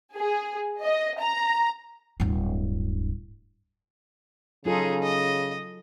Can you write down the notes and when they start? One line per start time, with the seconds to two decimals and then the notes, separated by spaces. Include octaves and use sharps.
0.17 G#4
0.83 D#5
1.20 A#5
2.20 D1 G2
4.65 C#3 F#3 D#4 F4 G#4 A4
5.03 D#5